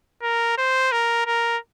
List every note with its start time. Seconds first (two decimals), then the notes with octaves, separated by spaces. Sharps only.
0.23 A#4
0.58 C5
0.92 A#4
1.27 A#4